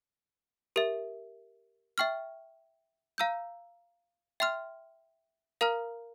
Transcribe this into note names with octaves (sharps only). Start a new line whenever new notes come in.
G4 A#4 E5
E5 G5 C#6 F6
F5 A#5 E6 G6
E5 G5 C6 F6
A#4 F5 A#5 F6